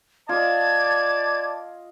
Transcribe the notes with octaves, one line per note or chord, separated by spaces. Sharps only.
F4 D5 D#5 A5 G#6